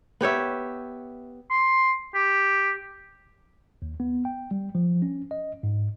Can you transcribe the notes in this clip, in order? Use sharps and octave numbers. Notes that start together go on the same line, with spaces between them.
B3 G4 C#5 E5
C6
G4
D#2
B3
G5
G3
F3
C#4
D#5
G#2